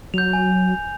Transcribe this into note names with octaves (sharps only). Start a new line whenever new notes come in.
F#3 G6 F7
G#5